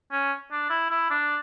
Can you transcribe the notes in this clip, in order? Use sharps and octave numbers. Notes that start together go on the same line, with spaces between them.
C#4
D4
E4
E4
D4